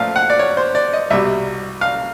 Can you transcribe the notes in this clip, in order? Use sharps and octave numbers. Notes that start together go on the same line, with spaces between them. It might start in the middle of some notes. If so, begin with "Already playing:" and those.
Already playing: A#2 F3 A3 F5
F#5
D5
C#5
C5
D5
D#5
C2 B2 G3 E5
F5